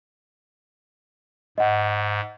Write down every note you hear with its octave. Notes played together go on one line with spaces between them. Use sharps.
G#2 D#5 F#5